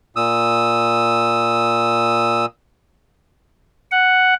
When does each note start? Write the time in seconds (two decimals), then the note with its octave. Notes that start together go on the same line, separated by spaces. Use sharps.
0.16 A#2 D#6 E6
3.92 F#5